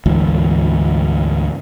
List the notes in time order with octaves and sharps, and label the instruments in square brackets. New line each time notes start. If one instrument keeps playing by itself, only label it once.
[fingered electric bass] D2 G#2 E3